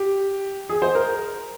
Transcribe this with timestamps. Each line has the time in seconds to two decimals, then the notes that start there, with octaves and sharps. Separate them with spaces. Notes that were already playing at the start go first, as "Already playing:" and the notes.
Already playing: G4
0.69 G#4
0.82 C5
0.95 A#4